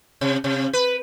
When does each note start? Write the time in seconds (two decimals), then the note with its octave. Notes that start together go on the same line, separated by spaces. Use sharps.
0.21 C3
0.44 C3
0.73 B4